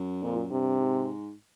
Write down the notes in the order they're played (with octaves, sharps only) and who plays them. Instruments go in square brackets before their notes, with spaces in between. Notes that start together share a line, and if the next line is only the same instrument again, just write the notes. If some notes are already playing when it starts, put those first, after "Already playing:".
Already playing: [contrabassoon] F#2
[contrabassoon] F2 [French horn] A#2
[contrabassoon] F#2
[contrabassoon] G2 [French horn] C3
[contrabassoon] G#2